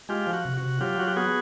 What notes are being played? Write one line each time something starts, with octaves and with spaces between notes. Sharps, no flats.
G#3 F4 G4
F3
F#4
C3
F#4
C3
F#3 F4 G4
F#3 F#4
G4
B3 F#4 G#4